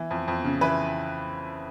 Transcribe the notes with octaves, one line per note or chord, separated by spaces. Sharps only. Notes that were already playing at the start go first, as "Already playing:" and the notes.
Already playing: E3
F2
F2
C#3
E3 B4